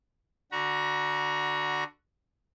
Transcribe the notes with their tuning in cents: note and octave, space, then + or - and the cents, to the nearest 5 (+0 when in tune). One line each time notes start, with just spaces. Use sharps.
D3 +5 F#4 +0 A#5 +35